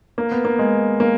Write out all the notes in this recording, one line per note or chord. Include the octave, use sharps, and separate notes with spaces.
A#3
B3
A#3
G#3
A#3